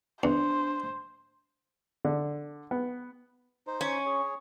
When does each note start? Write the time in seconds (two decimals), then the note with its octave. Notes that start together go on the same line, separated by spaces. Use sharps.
0.23 E2 D4 C5
2.05 D3
2.71 B3
3.67 D#4 C5
3.81 C#4
4.06 G#4 C#5